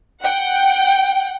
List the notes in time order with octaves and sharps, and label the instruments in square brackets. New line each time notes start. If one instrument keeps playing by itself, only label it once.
[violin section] F#5 G5